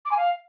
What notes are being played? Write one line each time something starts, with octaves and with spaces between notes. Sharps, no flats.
D6
G#5
F5